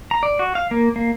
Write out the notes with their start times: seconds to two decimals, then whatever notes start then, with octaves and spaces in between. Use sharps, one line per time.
0.11 A#5
0.23 D5
0.39 F#4
0.55 F5
0.71 A#3
0.96 A#3